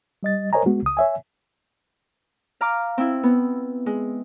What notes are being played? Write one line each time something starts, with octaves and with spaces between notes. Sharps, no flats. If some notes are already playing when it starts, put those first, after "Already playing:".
G3 D#5 A6
A#4 C5 C#5 D#5 G#5 A#5
G#3 B3 F#4
C#2 D#6
C#5 E5 G#5
F5 A#5 D6 F6
C4 E4
B3
G#3